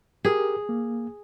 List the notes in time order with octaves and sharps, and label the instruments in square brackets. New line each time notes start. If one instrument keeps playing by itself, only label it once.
[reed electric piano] G4 A#4 [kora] G#4
[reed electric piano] A#3